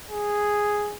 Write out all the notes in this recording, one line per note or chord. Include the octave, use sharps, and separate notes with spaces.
G#4